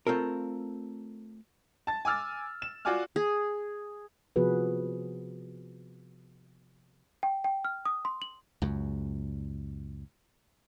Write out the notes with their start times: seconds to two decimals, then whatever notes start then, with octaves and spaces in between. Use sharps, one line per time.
0.07 A3 C4 F4 A4 A#4
1.87 A5 A6
2.05 G#5 D6 E6 F6 A6
2.62 E7
2.85 F4 F#4 D5 G#5 D6 F6
3.16 G#4
4.36 C3 F3 B3 F#4 G#4 B4
7.23 G5
7.44 G5
7.65 F6
7.86 D#6
8.05 C6
8.22 F#7
8.62 C#2 F#2